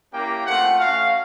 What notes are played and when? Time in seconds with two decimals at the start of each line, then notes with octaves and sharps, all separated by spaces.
0.12 A#3 C#4 E4 G4 G5
0.46 A3 C4 F4 F#5
0.79 A3 C#4 F#4 F5